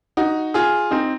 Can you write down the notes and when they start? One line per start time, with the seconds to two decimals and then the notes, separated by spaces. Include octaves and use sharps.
0.17 D#4 F#4
0.54 F4 G#4
0.91 C4 D#4